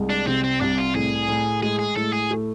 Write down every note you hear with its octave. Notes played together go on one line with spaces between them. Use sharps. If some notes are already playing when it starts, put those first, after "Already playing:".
Already playing: C2 G#3
D4
C3 C4
C4
C2 D4
F4
A2 G#4
A2
G#3 G#4
G#4
A2 A4
G#4
A3